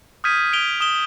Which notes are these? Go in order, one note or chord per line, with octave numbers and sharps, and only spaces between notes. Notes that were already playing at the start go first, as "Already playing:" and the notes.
D#6 F6 G6 G#6 B6 D#7
D7 F7 G7
D#6 E7 G7